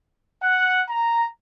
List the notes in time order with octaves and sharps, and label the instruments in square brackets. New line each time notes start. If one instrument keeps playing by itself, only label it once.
[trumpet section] F#5
A#5